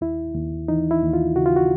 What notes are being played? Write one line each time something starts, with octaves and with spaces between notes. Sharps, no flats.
D#2 E4
D#2
E3 D#4
E4
D#2
F4
C#3 F#4
F4
F#4